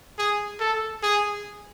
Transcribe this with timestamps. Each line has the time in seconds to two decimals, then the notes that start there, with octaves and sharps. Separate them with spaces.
0.19 G#4
0.60 A4
1.03 G#4